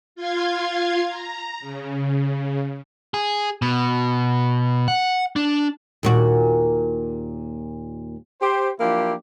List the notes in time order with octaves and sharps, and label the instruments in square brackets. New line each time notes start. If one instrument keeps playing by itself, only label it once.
[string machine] F4 F5 C6 G#6
A#5
C#3
[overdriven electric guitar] G#4
B2
F#5
D4
[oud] D#2 A#2 F#4
[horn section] G4 C5
F3 F#3 A#3 D4 E4 G4